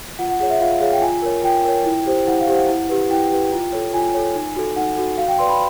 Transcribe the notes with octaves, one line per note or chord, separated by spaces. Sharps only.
F4 F#5
F#5
G#4 C#5 F#5
E5
F4 F5
G#4 C#5 F5
G5
F4 G#5
A#4 C#5
F4 G5
A#4 C#5
E4
G4 C5
E4 F#5
F5
G4 C5
F#5
E4
G4 B4
E4 G5
G4 B4
F4
A4 C#5
F4 G#5
A4 C#5
D#4
F#4 A4
D#4 F#5
F#4 A4
F#4 F5
G5
B4 D5 C6
B5